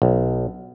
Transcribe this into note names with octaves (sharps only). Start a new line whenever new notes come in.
B1